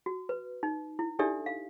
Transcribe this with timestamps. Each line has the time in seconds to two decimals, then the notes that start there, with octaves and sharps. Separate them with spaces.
0.06 F#4
0.29 B4
0.63 D#4
0.99 E4
1.19 D4 D#4 G4 A4 D5 E5
1.46 F5